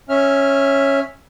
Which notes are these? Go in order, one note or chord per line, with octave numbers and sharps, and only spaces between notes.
C#4 E5 F6